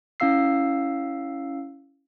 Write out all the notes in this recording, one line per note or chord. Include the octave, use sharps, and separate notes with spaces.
C#4 E4 F5 E6 C7